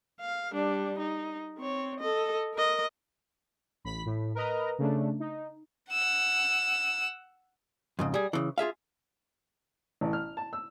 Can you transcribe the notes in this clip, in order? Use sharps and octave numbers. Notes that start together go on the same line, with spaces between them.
F5
G3 D4
D#4
C4 C#5
A4 D#5
A#4 D#5
A1 B5 B6
A2
A#4 B4 D#5 A#5
C#3 A3 D4
D#4
F#5 E6
F2 G#2 C#3
G3 G#4
C#3 E3
F4 G#4 E5 F5
A1
F6
A5
E6